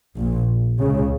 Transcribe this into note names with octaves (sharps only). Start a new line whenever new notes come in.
A#1 A#2
C#2 C#3